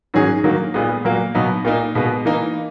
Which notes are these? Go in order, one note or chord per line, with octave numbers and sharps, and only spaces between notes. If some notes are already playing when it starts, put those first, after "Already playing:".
G#2 D#3 F#3 C#4 G#4
D#3 F#3 A#3
A#2 G#3 B3
A#2 F#3 A#3
B2 F#3 B3 D#4
A#2 A#3 D#4
B2 G#3 B3
E3 A#3 D#4